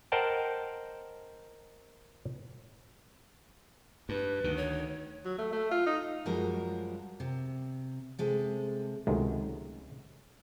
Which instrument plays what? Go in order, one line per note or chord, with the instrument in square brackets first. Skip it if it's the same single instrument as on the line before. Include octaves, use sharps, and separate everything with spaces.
[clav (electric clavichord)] A#4 C5 D#5 F#5 G5 A5
[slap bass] G2 [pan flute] B4
[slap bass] D2 D#3
[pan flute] C#5
[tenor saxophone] F#3
A3
A3
F4
D#4
[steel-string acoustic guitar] F#2 F3 G3 G#3 F#4 A#4
C3
C3 G#3 A4
[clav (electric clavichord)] C#2 C3 D#3 F#3 G#3 A3